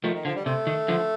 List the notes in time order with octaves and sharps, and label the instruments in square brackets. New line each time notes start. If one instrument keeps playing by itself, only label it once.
[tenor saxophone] D#3 [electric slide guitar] F3 A3
[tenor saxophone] D#3
[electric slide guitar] D3 [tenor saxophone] F3
[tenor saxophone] G3
[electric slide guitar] C3 [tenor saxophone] A3
[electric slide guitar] D#3
D3 F3